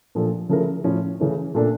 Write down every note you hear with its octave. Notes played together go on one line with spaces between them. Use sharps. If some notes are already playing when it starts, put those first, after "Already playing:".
A#2 F3 A3 D4 A4
C#3 F3 A3 E4 A#4
A2 F3 C#4
C#3 E3 A3 C#4
A#2 A3 D4 A4